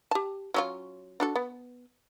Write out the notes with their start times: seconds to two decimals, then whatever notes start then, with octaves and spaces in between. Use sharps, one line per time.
0.11 G4 A5
0.54 F#3 C#4 F4
1.20 D4 F#4 A4
1.35 B3